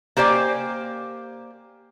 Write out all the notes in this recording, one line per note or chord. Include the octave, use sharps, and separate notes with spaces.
A#3 G4 C5 D5 G#5